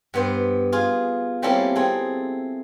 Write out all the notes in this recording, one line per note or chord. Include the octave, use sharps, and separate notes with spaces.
G2 B3 C5
F4 G#4
G3 A#3 C4 C#4 E4 A4
C4 G#4 A4